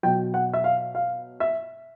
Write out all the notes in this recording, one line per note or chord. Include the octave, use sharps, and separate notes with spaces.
B2 F#3 G5
F#5
E5
F5
F5
E5